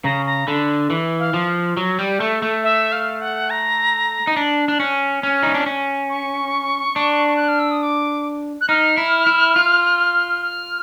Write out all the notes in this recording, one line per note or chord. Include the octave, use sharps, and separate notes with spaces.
C#3 A#5
A#5
D3 B5
E3
F5
F3
F#3
G3
A3
A3
E5
F5
F#5
A#5
D#4
D4
D4
C#4
C#4
D#4
D4
C#4
C#6
D4
F#6
F6
E6
D#6
D6
F#6
D#4 F6
E4
E4
F4
F6